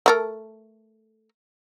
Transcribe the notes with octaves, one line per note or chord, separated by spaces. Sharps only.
A3 A4 A#4